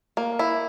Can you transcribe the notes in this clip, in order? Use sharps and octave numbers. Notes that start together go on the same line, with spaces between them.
A#3
E4